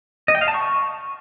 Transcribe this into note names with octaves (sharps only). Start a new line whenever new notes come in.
D#5
G5
F5
A5
C#6